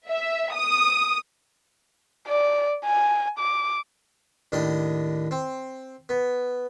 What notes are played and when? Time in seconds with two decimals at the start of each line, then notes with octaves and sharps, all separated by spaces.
0.10 E5
0.55 D#6
2.27 D5
2.85 G#5
3.39 D6
4.52 D#2 A2 D4 D#5
5.31 C4
6.09 B3